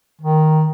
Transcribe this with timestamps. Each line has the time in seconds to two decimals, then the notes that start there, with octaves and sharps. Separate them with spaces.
0.21 D#3